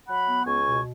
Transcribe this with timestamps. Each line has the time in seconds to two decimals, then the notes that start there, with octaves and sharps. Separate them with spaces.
0.07 F#3 F#5 B5
0.26 B3
0.45 C#2 G#5 C#6
0.65 B2